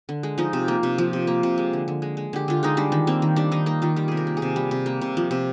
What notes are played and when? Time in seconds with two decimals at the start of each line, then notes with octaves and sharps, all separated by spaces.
0.09 D3
0.23 G#3
0.38 F3 D#4
0.53 C3
0.68 A#3
0.83 C3
0.98 F3
1.13 C3
1.27 A#3
1.43 C3
1.58 G#3
1.73 D3
1.88 D3
2.02 G#3
2.17 G#3
2.33 D3 G4
2.48 D3 F4
2.63 G#3 D#4
2.77 G3 D4
2.92 D#3
3.07 A#3 C4
3.22 D#3
3.36 G3 D4
3.52 D#3 D#4
3.66 A#3 D#4
3.82 D#3 F4
3.96 G3 G4
4.08 C3 G#4
4.17 A#4
4.27 A#3
4.37 G#4
4.42 C3
4.56 G3
4.71 C3
4.86 A#3
5.01 C3
5.17 F3
5.31 C3